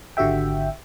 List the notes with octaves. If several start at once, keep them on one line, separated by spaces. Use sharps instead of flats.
G#1 D3 F#4 G4 E5 G5